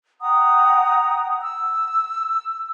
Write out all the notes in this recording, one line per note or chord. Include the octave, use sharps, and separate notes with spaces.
F#5 G5 A#5 D#6
E6